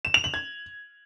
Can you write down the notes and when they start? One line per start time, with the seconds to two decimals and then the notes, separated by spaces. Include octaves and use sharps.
0.05 E7
0.14 F7
0.24 F#7
0.34 G#6